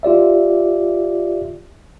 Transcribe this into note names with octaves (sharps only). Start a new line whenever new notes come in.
F4 G4 D5 E5